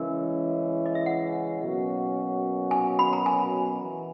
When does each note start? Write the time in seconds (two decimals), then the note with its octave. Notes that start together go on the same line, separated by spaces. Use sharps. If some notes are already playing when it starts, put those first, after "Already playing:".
Already playing: C#3 E3 G#3 C#4 A#4
0.86 D#5
0.95 E5
1.06 F#5
1.61 B2 F#3 A#3 C#4 F#4
2.71 G#5
2.99 B5
3.13 A#5
3.26 G#5
3.82 E3